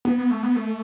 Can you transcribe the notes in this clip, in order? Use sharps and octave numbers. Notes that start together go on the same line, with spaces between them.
B3
B3
A3
B3
A3